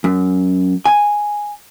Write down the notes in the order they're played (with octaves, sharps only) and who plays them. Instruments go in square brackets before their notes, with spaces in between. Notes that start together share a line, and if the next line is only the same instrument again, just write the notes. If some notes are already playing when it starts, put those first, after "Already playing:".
[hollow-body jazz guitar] F#2
G#5